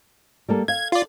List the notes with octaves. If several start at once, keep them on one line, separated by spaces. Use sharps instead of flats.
G3 A#3 A4
F5 G#6
F4 D5